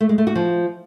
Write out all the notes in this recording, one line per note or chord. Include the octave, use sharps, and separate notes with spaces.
A3
G#3
A3
F#4
F3